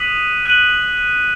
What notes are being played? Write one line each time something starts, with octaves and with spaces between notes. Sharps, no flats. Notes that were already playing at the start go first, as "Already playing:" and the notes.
Already playing: D#6 F#6 B6 D#7 F#7
F#6 D#7 F#7